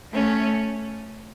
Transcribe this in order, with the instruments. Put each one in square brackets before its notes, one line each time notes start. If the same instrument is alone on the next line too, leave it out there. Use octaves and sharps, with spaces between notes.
[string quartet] A3 C#4